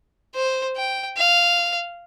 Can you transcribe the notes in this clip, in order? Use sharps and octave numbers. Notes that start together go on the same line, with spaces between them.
C5
G5
F5